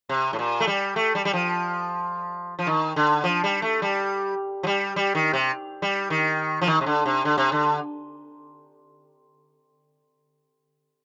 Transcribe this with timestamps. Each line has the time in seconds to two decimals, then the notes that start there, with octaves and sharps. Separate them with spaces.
0.09 C3
0.33 A2
0.39 A#2
0.60 A3
0.67 G3
0.96 A3
1.15 G3
1.25 G3
1.33 F3
2.59 F3
2.67 D#3
2.96 D3
3.24 F3
3.44 G3
3.62 A3
3.82 G3
4.63 F3
4.67 G3
4.96 G3
5.15 D#3
5.33 C3
5.82 G3
6.10 D#3
6.61 F3
6.67 D#3
6.81 C3
6.86 D3
7.06 C3
7.25 D3
7.38 C3
7.52 D3